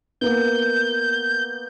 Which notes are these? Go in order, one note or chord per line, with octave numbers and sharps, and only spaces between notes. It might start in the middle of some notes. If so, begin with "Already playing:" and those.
A#3 B3 G6